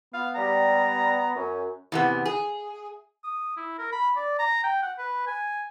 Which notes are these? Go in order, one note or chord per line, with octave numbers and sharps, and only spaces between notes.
B3 F5
G3 A#5
F#2 C#4
E2 C3 B3
G#4
D#6
E4
A#4
B5
D5
A#5
G5
F#5
B4
G#5